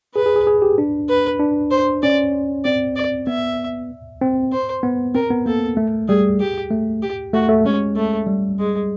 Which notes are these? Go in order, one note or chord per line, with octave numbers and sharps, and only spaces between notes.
G#4 B4
G#4
G#4
G#4
G4
D4
B4
D4
C5
C#4 D5
C4 D5
D5
B3 E5
C4
C5
B3
C4 A#4
B3
A#3 A4
A3
G3 G#4
G4
A3
G4
A3 F#4
A3
G#3 C#4
A3
G3
G#3